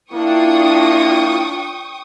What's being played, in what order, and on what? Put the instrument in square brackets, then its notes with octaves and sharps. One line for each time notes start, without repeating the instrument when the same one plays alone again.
[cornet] A#3 [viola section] D4 F4 [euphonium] E4 [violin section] G5 C#6 D#6